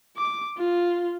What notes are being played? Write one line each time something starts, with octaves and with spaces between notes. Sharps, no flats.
D6
F4